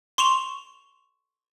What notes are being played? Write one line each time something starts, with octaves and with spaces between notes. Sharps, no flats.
C6 C#6 E7 F7